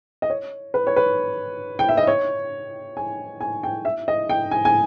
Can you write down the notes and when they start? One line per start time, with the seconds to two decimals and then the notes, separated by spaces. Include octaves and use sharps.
0.22 D#5
0.30 C#5
0.74 B4
0.87 C#5
0.96 B4
1.79 G5
1.89 E5
1.97 D#5
2.07 C#5
2.97 G#5
3.41 G#5
3.63 G5
3.85 E5
4.08 D#5
4.29 G5
4.51 G#5
4.65 G#5